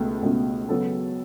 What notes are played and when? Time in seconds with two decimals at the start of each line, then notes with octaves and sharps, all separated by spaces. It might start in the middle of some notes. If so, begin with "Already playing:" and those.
Already playing: C#2 B2 A3
0.23 C#2 B2 A3
0.69 C#3 F#3 B3 F#4 A4